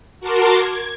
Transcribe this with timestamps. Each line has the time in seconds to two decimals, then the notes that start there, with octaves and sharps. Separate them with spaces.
0.20 F#4 A#4 A5 C6 D6
0.55 G#6